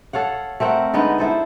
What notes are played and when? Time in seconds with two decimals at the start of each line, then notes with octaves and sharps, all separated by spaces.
0.13 A4 C#5 F5 F#5
0.60 A3 C4 A#4 F#5
0.94 D3 G#3 B3 D#4
1.18 E4 A4 C5